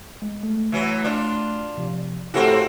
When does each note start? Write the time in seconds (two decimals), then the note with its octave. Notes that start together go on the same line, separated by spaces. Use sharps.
0.22 G#3
0.43 A3
0.72 E3 F#3
1.04 D4 F4
1.77 C3 F3
2.34 A2 A#3 C4 E4 F#4 G4